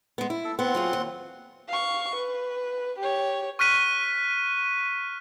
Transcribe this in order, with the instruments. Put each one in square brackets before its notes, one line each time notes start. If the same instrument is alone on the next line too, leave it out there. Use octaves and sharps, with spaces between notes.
[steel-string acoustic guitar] G#3 B3
E4
[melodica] A4
[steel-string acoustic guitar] B3 [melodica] C4 F#5 C6
[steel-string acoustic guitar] F#3 F4 G#4
D#2
[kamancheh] F5 C#6
B4
G4 C#5
[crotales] C#6 F6 F#6 B6 D#7